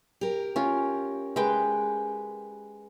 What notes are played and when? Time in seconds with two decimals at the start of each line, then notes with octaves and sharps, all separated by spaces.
0.21 G4 A#4
0.56 C#4 F4
1.36 G#3 B4 G5